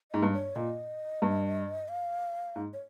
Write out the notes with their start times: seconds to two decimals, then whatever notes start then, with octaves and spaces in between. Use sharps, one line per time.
0.11 G#2 D#5
0.22 G2
0.33 C#5
0.56 A#2 D#5
1.22 G2
1.88 F5
2.56 G#2
2.73 C#5